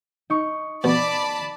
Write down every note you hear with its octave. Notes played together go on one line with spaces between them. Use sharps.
D#4 C#6
B2 D5 A5 B5